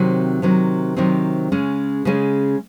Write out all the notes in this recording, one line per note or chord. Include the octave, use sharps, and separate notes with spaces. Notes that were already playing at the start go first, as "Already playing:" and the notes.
Already playing: C3 D#3 F#3 C4
C3 D#3 F#3 C4
C3 D#3 F#3 C4
C#3 G#3 C#4
C#3 G#3 C#4